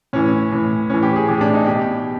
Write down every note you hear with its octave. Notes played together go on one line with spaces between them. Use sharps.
A2 E3 C#4
A2 E3
A2 E3 C#4
G4
G#4
A2 E3 G4
D4
D#4
B2 G4